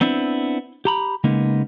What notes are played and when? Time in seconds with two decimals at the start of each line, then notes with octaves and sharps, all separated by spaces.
0.01 B3 C4 D4 E4
0.85 G4 A#5 B5
1.24 C#3 G#3 A#3 B3 D#4